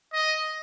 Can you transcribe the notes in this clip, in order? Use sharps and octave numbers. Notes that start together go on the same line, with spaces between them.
D#5